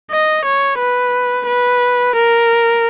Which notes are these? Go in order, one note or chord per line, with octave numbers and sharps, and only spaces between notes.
D#5
C#5
B4
B4
A#4